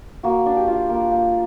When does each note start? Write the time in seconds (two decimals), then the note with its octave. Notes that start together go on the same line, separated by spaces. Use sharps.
0.23 A#3 F#4
0.46 D4
0.57 G4
0.67 F4
0.89 A#3
1.11 A#3